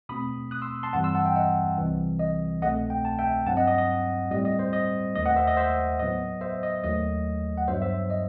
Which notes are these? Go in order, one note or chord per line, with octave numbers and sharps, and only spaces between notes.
B2 A3 C4 B5 D#6
D#6 F#6
C6 E6
A5 C6
G2 E3 G3 C4 F#5 A5
C6 E6
F#5 A5
E5 G5
D#5 F#5
C2 C3 E3 G3 C4
D#5
C2 B2 A3 C4 D#5 F#5
G5
A5
E5 G5
G2 F#3 C4 F#5 A5
D#5 F#5
D#5
D#5
A2 G3 C4 D#5
D#5
C5
D#5
D#2 D#3 A3 D#5
D#5 F#5
C5 E5
D#5
C5 E5
A2 F#3 B3 D#5
C5 E5
D#5
D#2 D#3 F#3 A3 D#5
F#5
G2 F#3 B3 C5 E5
C5 E5
D#5